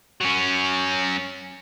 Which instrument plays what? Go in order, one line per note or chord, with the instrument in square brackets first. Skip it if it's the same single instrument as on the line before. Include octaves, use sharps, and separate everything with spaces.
[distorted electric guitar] F#3 C#4